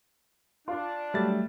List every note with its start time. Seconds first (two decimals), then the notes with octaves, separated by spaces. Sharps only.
0.68 D4 F4
1.14 F#3 G3 A3 E5 A6